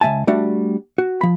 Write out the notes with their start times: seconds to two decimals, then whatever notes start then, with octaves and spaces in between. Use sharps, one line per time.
0.01 C#2 F3 E5 G#5 A5
0.27 G3 A3 D4 F#4
0.98 F#4
1.21 F3 B5